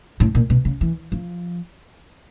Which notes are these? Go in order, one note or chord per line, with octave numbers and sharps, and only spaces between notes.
A2
A#2
B2
C#3
E3
F3